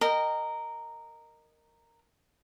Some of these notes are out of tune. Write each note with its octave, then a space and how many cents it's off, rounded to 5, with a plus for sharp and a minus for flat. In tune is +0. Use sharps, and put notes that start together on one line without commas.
A#4 -10 D#5 -15 G5 +0